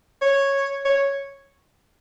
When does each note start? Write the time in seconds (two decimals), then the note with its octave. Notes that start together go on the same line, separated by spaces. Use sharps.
0.22 C#5
0.85 C#5